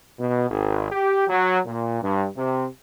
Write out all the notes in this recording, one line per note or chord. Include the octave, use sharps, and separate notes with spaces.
B2
G#1
G4
F#3
A#2
G2
C3